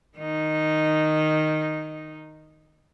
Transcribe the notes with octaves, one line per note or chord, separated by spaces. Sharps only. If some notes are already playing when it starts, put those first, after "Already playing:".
D#3 D#4